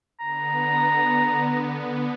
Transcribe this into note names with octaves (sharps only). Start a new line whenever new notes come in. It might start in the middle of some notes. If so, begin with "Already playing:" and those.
D3 B3 A#5